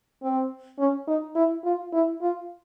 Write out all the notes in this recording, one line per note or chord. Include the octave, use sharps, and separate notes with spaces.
C4
C#4
D#4
E4
F4
E4
F4